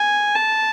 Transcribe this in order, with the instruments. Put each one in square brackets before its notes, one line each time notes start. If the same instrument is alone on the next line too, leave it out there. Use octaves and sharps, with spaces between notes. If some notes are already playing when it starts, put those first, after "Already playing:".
Already playing: [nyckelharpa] G#5
A5